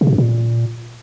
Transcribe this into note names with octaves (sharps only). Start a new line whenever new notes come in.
C3
B2
F#2
A#2